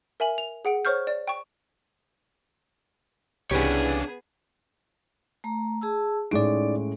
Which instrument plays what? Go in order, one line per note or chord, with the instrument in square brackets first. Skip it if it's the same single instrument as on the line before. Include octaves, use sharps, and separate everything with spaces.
[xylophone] A#4 E5 G#5 F#7
F7
G#4 F#5 D7
C5 C#5 C#6 F6 G6
D5
G5 C#6
[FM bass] C2 [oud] C#3 E3 G4 [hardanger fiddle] B3 G#4 [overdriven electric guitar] D4 C#5
[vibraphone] A3 A#5
G#4 A5 E6
[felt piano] A2 G#3 D7 [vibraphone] C#4 [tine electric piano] D#4 D5